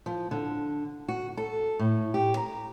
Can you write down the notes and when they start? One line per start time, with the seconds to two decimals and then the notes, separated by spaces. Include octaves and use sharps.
0.06 F3
0.31 D3
1.08 F#4
1.37 A4
1.79 A2
2.14 G4
2.37 A#5